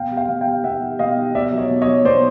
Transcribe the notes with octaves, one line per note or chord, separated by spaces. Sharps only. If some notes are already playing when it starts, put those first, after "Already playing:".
Already playing: B2 F5 G5
G3
F5 G5
B2
F5 G5
G3
B2 E5 F#5
G3
B2 D#5 F5
G3
B2 D5 E5
F#3
C#5 D#5
B2
C#5 D#5
F#3
B2 C5 D5